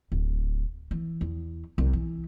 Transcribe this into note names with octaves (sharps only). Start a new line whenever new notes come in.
D1
E3
E2
C2
E3